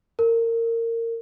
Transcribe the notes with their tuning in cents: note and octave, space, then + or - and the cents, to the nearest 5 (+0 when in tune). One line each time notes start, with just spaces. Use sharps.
A#4 -25